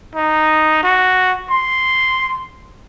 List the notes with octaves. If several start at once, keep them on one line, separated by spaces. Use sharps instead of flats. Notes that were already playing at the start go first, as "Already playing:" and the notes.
D#4
F#4
C6